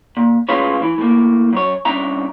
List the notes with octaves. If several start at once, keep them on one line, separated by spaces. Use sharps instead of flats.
A#2
A2 G#3 C#4 F4 B4 C#5
E3
A2 A#3
F#2 C#5
C2 C#4 D4 E5 A#5